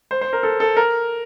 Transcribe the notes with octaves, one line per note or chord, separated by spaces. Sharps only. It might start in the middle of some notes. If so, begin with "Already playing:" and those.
C5
C5
A#4
A4
A4
A#4